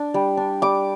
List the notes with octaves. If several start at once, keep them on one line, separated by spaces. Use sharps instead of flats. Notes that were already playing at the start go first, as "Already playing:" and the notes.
Already playing: D4
G3
D4
G3 D6